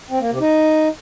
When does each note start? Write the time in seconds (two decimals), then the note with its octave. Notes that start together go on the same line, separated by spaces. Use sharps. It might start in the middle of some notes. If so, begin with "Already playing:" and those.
0.10 C4
0.20 A#3
0.30 C3
0.41 D#4